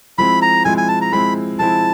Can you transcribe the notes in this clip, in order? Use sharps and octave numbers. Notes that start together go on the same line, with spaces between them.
F3 G#3 C4 E4 B5
A#5
F3 G#3 C4 E4 G#5
G#5
A5
A#5
F3 G#3 C4 E4 B5
F3 G#3 C4 E4 A5